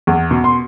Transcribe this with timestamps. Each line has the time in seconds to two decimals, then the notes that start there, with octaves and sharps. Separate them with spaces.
0.07 E2
0.31 B2
0.44 C6